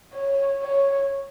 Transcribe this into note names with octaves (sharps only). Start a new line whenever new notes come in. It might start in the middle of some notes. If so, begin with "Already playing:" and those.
C#5
C#5